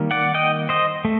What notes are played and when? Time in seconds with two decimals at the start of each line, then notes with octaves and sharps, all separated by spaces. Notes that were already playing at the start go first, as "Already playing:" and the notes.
Already playing: D#3 G3 A#3
0.11 D5 F#5
0.34 D#5 G5
0.69 C5 D#5
1.05 A3